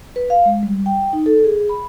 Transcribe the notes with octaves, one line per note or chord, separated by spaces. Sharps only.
B4
F5
G#3
G3
G5
D#4
A4
G#4
B5